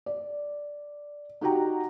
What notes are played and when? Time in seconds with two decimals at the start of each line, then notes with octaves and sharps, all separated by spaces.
0.06 D5
1.41 D#4 F#4 G4 F#5 G5 A#5